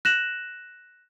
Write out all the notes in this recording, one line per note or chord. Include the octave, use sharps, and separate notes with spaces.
F#6 A#6 E7 F#7